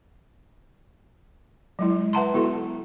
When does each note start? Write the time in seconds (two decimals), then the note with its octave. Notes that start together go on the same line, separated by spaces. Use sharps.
1.79 F#3 G#3 E4
2.13 B4 E5 F#5 A5 A#5 C6
2.34 B3 E4 F#4 A4